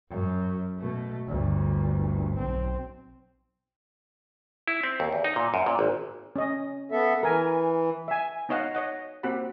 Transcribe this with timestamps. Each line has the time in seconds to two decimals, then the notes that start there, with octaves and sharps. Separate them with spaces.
0.10 F#2
0.78 B2 A3
1.28 G1 D2
2.38 B1 C4
4.68 E4
4.83 C4
5.00 D#2
5.12 E2
5.24 D#4
5.36 A#2
5.54 F#2
5.66 A#2
5.79 G#1
6.36 C#4 D#5
6.92 B3 A4 E5
7.23 E3 A#4 G#5
8.08 E5 G#5
8.49 B3 D#4 C#5 D#5 F5 F#5
8.75 C#5 D#5 F#5
9.23 A#3 C4 F#4 G4 F#5 B5